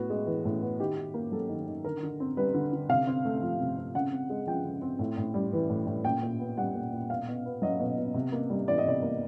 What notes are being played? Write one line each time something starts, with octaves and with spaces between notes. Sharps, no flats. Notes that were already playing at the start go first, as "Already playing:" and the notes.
Already playing: A2 B3 F#4
G#3
E3
A2
B3
D#3 G4
D#3
A#3
F#3 A4
D#3
D#3
D3 A#4
D3
C4
G3 B4
D3
D3
C3 F5
C4
A3
F3
C3
C4
C#3 F#5
C4
G#3
F3 G5
C#3
C4
A2
A2
G3
E3
A2
A2
A#2 G5
A#2
B3
G3 F#5
A#2
A#2
B2 F5
B2
B3
F#3 D#5
B2
B2
C3
A#3
G3
E3 D5
D#5
C3 D5
A#3